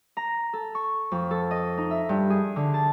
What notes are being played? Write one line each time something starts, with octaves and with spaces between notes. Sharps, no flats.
A#5
A4
C#6
F2
A4
D#5
D#4
E5
G2
G#4
D3
A5